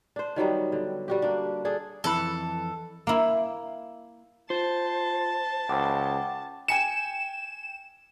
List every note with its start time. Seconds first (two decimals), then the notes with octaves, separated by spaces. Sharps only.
0.16 D4 C5
0.36 D#3 F#3 G3 B3
0.72 D3
1.08 G3 F#4 G4
1.22 A#3 D4
1.65 D4 G#4 A4
2.04 F2 E3 A4 B5
3.07 A#3 E4
4.50 F4 C5 A5
5.69 C#2 F#5 G5 D6
6.68 G5 G#5 C#7 E7